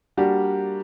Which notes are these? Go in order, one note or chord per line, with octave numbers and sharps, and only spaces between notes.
G3 A#3 D4 F#4 G4